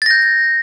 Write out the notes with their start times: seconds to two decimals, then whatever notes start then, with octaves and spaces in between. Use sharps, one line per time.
0.02 A6
0.06 A#6
0.11 G6